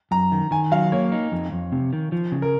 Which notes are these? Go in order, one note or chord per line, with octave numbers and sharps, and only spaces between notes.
F#2 A#5
D#3
D#3 G#5
F#3 F5
A#3 C#5
D#4
F2
F2
C3
D#3
F3
C#3
A#4